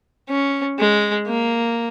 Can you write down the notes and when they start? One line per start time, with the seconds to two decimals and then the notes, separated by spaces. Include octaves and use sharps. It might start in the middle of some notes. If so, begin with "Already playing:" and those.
0.29 C#4
0.79 G#3
1.28 A#3